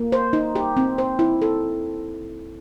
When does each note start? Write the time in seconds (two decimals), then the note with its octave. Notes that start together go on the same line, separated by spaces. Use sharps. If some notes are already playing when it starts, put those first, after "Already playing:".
Already playing: A#3
0.12 C5
0.33 D#4
0.55 G4
0.77 C4
0.98 C5
1.19 E4
1.42 A4